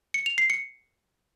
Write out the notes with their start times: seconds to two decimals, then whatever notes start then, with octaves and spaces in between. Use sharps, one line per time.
0.14 C#7
0.26 F7
0.38 C7
0.50 C#7